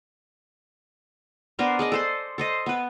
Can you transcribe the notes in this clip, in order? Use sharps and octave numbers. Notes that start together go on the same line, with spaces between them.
B3 D4 A#4 C5
G#4 D5 D#5
A4 C5 C6
A4 C5 D#5
B3 B4